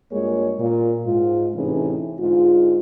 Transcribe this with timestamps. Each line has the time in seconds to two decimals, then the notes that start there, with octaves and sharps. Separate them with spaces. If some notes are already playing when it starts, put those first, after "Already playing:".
0.12 G2 G#3 A#3 F4 G#4 C#5
0.59 A#2
1.05 G#2 F4
1.55 A2 C3 E3 C#4 D#4 G#4
2.19 G#2 D3 G#3 F4